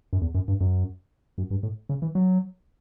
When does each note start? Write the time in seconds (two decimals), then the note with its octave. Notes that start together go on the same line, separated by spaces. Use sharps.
0.13 F#2
0.22 E2
0.35 F#2
0.48 G2
0.61 F#2
1.38 F#2
1.51 G2
1.63 A2
1.89 C#3
2.02 E3
2.15 F#3